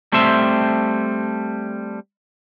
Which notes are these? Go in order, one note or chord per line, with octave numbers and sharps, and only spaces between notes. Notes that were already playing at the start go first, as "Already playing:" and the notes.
G3 A3 C4 C5 E5